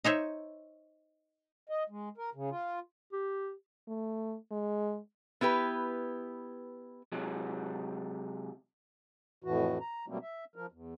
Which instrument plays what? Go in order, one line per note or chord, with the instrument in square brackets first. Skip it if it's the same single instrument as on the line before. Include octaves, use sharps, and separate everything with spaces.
[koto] D#4 C5 C#5 E5
[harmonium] D#5
G#3
A#4
C#3
F4
[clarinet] G4
[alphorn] A3
G#3
[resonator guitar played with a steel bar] B3 E4 G4 B4
[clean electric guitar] C3 F#3 G#3
[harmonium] F2 A2 E3 F#4
A#5
B2 F#3 G3 A3 A#3 C4
E5
F3 A#4
E2